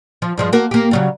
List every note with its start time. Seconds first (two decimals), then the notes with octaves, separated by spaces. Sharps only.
0.22 F3
0.37 G2 F3 G#3
0.53 A#3 F#4 A#4
0.71 A#3 G4
0.91 C#3 F#3 G3